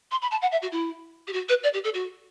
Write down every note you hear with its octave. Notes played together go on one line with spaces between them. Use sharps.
C6
B5
A5
F#5
E5
F#4
E4
G4
F#4
B4
D5
G4
A4
F#4